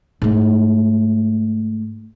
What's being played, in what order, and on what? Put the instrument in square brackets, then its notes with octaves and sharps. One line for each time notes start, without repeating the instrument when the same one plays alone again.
[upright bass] G#2 A3